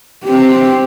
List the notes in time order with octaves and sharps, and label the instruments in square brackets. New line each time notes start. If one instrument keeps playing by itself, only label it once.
[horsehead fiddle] C4 G4